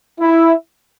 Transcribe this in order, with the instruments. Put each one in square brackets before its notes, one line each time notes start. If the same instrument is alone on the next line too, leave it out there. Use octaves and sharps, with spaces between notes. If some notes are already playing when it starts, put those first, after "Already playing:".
[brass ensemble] E4